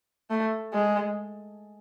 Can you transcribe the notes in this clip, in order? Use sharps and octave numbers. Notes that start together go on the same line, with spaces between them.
A3
G#3